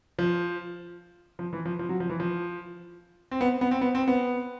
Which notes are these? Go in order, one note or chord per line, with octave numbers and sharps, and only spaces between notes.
F3
F3
E3
F3
F3
F#3
F3
E3
F3
C4
B3
B3
C4
B3
C4
B3